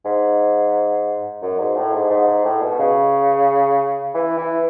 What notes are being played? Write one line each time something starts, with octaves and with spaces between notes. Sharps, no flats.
G#2
F#2
G#2
A2
G#2
G#2
G#2
A2
B2
C#3
E3
E3